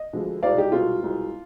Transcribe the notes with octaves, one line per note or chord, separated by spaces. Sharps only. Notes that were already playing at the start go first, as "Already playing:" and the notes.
Already playing: D#5
D2 D3 F3 G#3
C2 B2 G#3 D5 F5
D#4 G4
C2 B2 G#3 F4
C2 B2 G#3